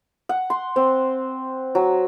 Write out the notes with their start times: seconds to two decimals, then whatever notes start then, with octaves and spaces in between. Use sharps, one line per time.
0.29 F#5
0.50 C6
0.76 C4
1.75 F#3